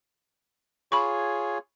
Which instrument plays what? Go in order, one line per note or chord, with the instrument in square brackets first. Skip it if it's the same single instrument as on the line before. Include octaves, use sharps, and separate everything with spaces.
[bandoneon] F4 G#4 C#5 [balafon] B5 C#6